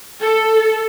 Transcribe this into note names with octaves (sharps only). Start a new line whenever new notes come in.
A4